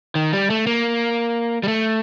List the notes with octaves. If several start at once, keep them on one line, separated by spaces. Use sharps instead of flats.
D#3
G3
A3
A#3
G3
A3